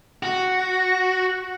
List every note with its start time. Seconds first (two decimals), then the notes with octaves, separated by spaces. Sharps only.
0.23 F#4